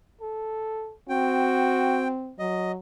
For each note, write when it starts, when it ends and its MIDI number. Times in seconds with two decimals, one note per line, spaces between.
0.21 0.94 69
1.09 2.34 60
1.09 2.12 66
1.09 2.08 79
2.39 2.76 54
2.39 2.72 75